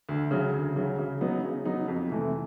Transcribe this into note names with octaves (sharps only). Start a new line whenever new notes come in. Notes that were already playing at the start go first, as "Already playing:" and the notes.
D2
C#3 F#3
D2
C#3 F#3
C#3
F#3 B3 D#4
C#3
F#3 B3 D#4
F2
C3 E3 A3